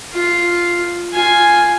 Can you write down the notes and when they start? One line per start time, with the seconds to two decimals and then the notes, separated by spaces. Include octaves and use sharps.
0.13 F4
1.13 F4 G#5